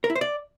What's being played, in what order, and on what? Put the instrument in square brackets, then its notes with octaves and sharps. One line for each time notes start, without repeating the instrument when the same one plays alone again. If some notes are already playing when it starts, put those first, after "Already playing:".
[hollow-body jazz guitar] A#4
E4
C5
D5